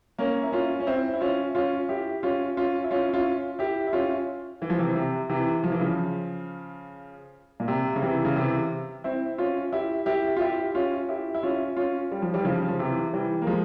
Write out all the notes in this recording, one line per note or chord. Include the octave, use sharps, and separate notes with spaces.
A#3 C#4
E4
C#4 F4
C#4
C4 E4
E4
C#4 F4
C#4 F4
E4 G4
C#4 F4
C#4 F4
E4
C#4 F4
E4
C#4 F4
E4 G4
E4
C#4 F4
E3
F3
C3 E3
C3
C3 E3
F3
E3
C#3 F3
A#2
C3
C#3
C3 E3
C#3
C3 E3
C4 E4
C#4 F4
E4 G4
E4 G4
F4
E4 G4
C#4 F4
E4 G4
E4
C#4 F4
C#4 F4
G3
F3
E3 G3
C#3 F3
F3
C3 E3
E3 G3
A#3
F3 G#3